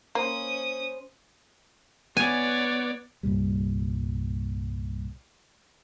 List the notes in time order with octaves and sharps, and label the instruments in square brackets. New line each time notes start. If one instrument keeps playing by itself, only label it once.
[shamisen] A#3 [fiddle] C#4 D#6 [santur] C5 C6
[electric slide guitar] B3 [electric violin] C#5 D5 [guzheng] G#5
[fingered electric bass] C2 G2 A#2 G3